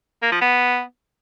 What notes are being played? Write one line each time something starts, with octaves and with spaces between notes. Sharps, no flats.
A#3
F3
B3